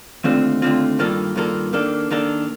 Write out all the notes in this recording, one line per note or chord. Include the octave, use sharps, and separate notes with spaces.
D#2 D3 A3 C4 F4
D#2 D3 A3 C4 F4
G2 D#3 A#3 F4 A4
G2 D#3 A#3 F4 A4
D#3 A#3 D4 A4
D#3 A#3 D4 A4